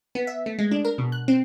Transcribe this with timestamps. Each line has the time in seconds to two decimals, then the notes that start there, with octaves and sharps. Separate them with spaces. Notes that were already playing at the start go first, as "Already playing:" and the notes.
0.15 B3
0.27 E5
0.46 A3
0.59 G#3
0.71 D4
0.85 A#4
0.98 B2
1.12 F#6
1.28 C4